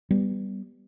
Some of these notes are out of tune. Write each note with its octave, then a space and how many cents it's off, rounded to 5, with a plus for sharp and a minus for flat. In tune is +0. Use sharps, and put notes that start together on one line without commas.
G3 +0 B3 +0